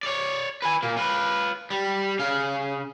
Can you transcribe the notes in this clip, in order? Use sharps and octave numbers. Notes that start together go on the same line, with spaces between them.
C#5 D5
B4 G#5
A#2 A#3
F4 B4
G3
C#3 F5